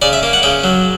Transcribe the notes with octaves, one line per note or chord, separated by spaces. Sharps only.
C#3 D5
E5
A#3
F#5
C#3 G5
F#3